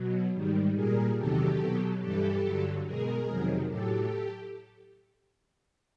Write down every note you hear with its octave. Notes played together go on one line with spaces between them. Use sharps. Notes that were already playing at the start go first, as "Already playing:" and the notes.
Already playing: B2 F#3
G#2 D#3 G3
A#2 G3 G#4 A#4
E2 C3 D#3 F#3 G4 A4
B2 F#3
G2 E3 G3 G4 A4
G2 D3 F#3
B2 G#3 G#4 A#4
F2 C3 D#3 F#3
A2 F#3 G4 A4